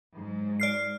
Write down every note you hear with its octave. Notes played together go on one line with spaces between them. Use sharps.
G#2 F#3
D5 F6 C7